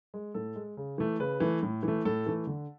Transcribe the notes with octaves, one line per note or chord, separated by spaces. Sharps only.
G#3
A2 A4
G#3
C#3
E3 A3
C#3 B4
E3 A3
A2
E3 A3
A2 A4
E3 A3
D3